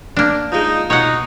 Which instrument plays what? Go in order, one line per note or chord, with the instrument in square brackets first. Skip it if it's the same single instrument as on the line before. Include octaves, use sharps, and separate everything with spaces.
[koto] A#3 D4
[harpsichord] F3 G#3 [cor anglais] D#4
[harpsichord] B2 [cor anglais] D#4 [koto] C#5 F#5